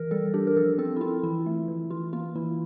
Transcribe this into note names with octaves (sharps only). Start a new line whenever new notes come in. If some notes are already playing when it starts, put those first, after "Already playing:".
Already playing: E3 A#4
G3 A4
D4 G4
A#4
F3 A4
C4 A4
E4
C4 F4
E3 E4
A3
E3
E3 F4
A#3 F4
E3 E4